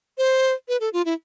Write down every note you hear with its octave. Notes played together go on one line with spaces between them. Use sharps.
C5
B4
A4
F4
E4